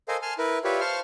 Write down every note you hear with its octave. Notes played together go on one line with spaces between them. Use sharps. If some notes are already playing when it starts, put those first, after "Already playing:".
A4 A#4 C5 D#5 F5 G#5
G#5 A5 C6 F6
E4 A#4 B4
F4 G4 B4 C#5 D5 E5
C5 F5 A5 C6 C#6 F6